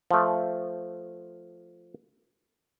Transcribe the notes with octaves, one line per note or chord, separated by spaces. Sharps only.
F3 A3